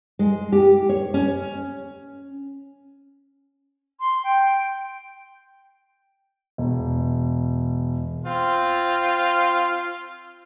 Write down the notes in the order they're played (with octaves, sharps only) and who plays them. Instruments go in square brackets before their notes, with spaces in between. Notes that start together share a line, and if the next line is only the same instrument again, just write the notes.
[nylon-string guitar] G#3
G4
C#5
C#4
[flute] C6
G5
[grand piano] E1
[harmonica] C4 F4